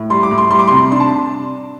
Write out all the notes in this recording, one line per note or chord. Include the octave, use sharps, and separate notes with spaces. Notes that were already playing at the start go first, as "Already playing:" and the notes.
Already playing: A2
G3 C6
D6
A2
C6
G3 C6
D6
C3 C6
D4 C6
A5